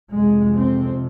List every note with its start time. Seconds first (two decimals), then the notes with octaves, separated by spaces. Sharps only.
0.11 F2 C3 G#3
0.56 C4